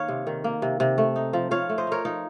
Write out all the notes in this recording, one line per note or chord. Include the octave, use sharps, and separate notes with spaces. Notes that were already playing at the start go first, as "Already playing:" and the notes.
Already playing: D#3 A#3 C#5 F5
C3
D#3
A#3
C3
C3
A3
D#4
F3
F3 C#5 F5
A3
C5 D#5
D#4 A#4 C#5
F3 D#4